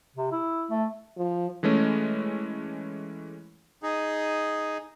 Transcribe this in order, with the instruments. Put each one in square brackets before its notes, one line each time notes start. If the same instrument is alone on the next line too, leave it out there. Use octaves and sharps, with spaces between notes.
[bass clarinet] C3
E4
A3
[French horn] F3
[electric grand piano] E3 G#3 A3 C#4
[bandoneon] D#4 G#4